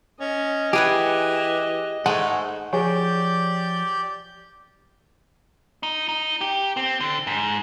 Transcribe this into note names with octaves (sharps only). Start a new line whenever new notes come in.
C#4 D#5
E3 G4 G#4 B4 F#5
G#2 G#3 A3 F#5
F3 G4 G#4 C#5 D5 F#5 G6
D#4
D#4
G4
C4
D3
G#2